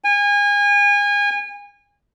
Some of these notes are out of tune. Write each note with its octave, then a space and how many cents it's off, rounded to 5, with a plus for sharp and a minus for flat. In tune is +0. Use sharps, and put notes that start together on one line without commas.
G#5 -30